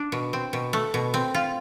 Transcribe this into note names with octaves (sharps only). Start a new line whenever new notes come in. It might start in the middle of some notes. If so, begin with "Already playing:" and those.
Already playing: D4
B2
C4
B2
A3
B2
C4
F4